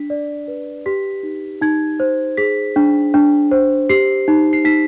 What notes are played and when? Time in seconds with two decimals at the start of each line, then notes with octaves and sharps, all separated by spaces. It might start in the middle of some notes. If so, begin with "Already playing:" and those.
Already playing: D4 B6
0.10 D5
0.48 B4
0.86 G4 B6
1.23 D#4
1.61 D#4 G#6
2.00 C5
2.37 G#4 B6
2.76 D4
3.14 D4
3.51 C5
3.90 G4 C7
4.28 D#4
4.53 C7
4.65 D#4 B6